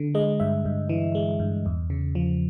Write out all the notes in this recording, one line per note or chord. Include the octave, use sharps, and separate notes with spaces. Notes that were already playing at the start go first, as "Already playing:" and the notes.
Already playing: D3
G#3 D#5
G2 E5
G2
E3
G#3
G2
E2
C#3
F3